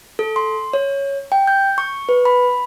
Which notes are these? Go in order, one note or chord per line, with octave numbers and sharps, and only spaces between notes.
A4
C6
C#5
G5
G6
C#6
B4
B5